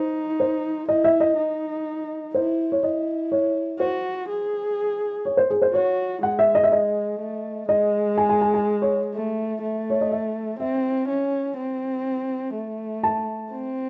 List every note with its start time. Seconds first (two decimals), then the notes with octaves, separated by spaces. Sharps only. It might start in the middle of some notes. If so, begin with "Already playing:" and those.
Already playing: D#4 C5
0.40 C5
0.89 E4 D#5
1.04 E5
1.20 D#5
1.37 D#4
2.34 E4 C5
2.72 C#5
2.83 E4 D#5
3.32 C#5
3.80 F#4 C5
4.29 G#4
5.25 C#5
5.37 C5
5.50 G#4
5.62 C5
5.74 F#4 C#5
6.23 G#3 F#5
6.39 E5
6.55 D#5
6.64 E5
6.72 D#5
7.20 A3
7.69 G#3 D#5
8.18 G#5
8.29 G#5
8.41 G#5
8.54 G#5
8.82 C#5
9.14 A3
9.62 A3
9.90 C#5
10.01 D#5
10.12 E5
10.59 C4 E5
11.08 C#4
11.57 C4
12.54 A3
13.03 A5
13.51 C4